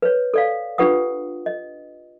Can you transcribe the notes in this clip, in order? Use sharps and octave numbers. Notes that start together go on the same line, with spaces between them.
B4 C#5
A4 D5 F5
D4 F4 G4 B4 F#5 D#6
D#5